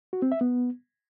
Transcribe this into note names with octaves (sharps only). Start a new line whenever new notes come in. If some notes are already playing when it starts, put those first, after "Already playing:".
F#4
C4
E5
B3